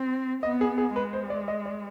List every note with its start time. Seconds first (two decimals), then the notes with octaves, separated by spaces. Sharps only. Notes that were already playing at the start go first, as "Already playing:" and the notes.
Already playing: C4
0.43 B3 D#5
0.61 G#4
0.78 G#4
0.96 G#3 B4
1.13 C5
1.30 D5
1.48 D#5
1.66 D5